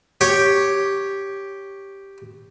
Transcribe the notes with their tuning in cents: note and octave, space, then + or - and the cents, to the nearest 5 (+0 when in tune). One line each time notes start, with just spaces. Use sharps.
G4 +0 C#5 +0